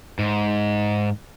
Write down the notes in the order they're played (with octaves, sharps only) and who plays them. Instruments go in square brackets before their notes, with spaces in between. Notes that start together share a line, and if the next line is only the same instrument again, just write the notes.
[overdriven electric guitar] G#2